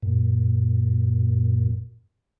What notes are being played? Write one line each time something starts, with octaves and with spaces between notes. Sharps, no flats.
F#2 A#2